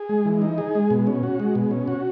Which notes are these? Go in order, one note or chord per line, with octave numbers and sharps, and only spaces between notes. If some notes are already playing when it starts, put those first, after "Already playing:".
Already playing: G#4
G#3
E3
D#4
G#4
G#3
B2
C#4
F#4
G#3
B2
C#4
F#4